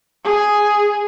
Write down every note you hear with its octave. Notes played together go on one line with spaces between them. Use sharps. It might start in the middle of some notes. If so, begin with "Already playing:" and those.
G#4